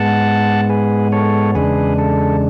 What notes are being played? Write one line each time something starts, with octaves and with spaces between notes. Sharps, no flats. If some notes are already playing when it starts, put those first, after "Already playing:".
Already playing: G#2 G#3 B3 F#5 A5
G#4 B4
A4 C#5
E2 C#3 G#3 D4 G#4 B4
A4